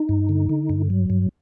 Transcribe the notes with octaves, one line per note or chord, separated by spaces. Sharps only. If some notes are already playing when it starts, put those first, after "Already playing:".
Already playing: D#4
G2
D3
D3
G2
F#3
G2